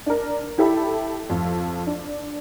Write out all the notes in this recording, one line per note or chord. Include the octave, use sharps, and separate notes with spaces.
D4 A#4
E4 G4 A4 E5 B5
F2
D4